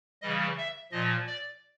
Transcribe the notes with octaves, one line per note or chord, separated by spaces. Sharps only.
C#3 E3 G3 D#5
E5
A#2 F3 D#5
D5